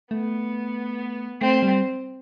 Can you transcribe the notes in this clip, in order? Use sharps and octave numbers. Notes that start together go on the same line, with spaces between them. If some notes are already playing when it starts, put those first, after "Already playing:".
A3 B3
A3 C4
G3